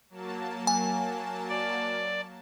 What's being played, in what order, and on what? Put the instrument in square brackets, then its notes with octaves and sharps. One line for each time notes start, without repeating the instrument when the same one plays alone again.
[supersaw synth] F#3 A#3 A5
[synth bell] G#5
[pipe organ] D5